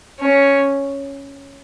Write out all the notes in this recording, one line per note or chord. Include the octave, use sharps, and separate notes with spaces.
C#4